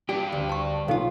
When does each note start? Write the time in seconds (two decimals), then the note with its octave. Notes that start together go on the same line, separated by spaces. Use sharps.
0.09 G2 G4 D5
0.32 D2
0.49 A5 C#6
0.88 B1 D#4 F4 A4 F5